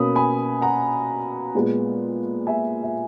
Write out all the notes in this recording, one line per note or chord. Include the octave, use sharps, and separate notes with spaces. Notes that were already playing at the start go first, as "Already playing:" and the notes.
Already playing: B2 A#3 C#4 B5 D#6
G#5 B5
F#5 A#5
A#2 G#3 B3
E5 G#5
E5